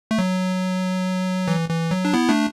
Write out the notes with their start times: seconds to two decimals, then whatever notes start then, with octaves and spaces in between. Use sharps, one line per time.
0.11 A3
0.18 F#3
1.48 E3
1.69 E3
1.91 F#3
2.05 D4
2.13 B3 E4
2.29 A3 D4